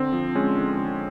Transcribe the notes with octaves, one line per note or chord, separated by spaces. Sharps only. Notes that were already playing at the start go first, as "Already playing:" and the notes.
Already playing: D3 C4
F3
G#3 C#4
D3
D3